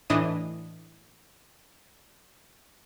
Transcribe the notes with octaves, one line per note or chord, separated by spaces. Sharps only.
A2 E3 D4 D#5 D#6